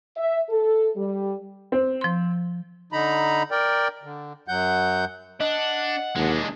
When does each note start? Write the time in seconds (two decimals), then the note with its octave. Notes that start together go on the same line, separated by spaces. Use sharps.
0.17 E5
0.50 A4
0.96 G3
1.72 C4
2.01 F3 C6
2.93 D3 D#4 A#5 B5
3.51 A#4 D5 G5
4.04 D3
4.48 F#2 F#3 F#5 G6
5.41 D4 D#5 F#5
6.15 D#2 G#3 D4